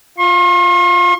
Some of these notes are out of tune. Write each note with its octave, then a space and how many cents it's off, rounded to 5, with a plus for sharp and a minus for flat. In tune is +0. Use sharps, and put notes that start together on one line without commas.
F4 +0 C6 +45